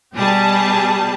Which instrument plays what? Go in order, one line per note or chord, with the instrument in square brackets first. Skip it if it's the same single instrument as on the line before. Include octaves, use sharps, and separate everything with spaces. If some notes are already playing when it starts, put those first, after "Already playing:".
[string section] B2 G3 G4 G#4 A5